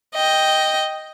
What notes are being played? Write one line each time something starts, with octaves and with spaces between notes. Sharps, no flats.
D#5 G5